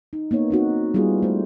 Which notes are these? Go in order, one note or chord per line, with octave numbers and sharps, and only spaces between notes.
D#4
A#3 B3 D#4 C#5
C4 D#4 F#4
G3 B3 E4 F4 G#4
A3 C5